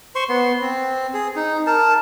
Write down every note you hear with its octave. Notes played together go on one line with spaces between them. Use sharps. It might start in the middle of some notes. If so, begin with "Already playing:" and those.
C5 C6 C#6
B3 C6
C4
G#4
D#4
A#4 A5